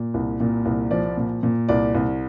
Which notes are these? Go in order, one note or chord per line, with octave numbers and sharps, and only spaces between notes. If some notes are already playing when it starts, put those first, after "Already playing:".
Already playing: A#2
C2
A#2
C2
F3 D5
A#2
A#2
C2 D5
C2